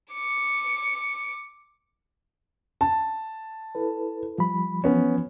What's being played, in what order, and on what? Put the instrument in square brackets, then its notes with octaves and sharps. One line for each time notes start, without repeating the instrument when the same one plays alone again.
[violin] D6 C#7
[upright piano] A5
[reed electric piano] E4 A4 B4
F3 G3 B5
[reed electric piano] E3 F3 [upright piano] B3 C#4